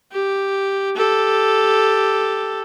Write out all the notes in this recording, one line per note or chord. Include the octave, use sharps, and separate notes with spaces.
G4
G4 A4